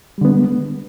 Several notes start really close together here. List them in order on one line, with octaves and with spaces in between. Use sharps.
G3 D3 B3 G#3